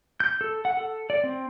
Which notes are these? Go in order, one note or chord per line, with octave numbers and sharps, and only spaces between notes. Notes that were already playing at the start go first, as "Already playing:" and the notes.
G6
A4
F#5
A4
D5
C4